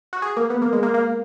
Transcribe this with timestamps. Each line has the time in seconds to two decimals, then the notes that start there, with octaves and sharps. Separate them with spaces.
0.13 F#4
0.22 G#4
0.36 A#3
0.50 B3
0.62 A#3
0.73 G#3
0.83 A#3
0.94 A#3